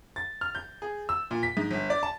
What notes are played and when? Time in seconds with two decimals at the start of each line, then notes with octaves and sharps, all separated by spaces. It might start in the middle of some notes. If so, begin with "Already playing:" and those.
0.16 A6
0.41 F6
0.55 G6
0.82 G#4
1.09 E6
1.31 A#2
1.43 B6
1.57 G#2
1.71 G1
1.90 D5
2.03 A5